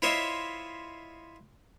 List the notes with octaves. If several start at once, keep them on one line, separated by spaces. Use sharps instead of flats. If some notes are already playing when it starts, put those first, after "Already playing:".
E4 F4 C5 C#5 D#5 E5